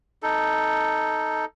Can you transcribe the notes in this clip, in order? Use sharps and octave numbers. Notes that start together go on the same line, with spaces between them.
D#4 A4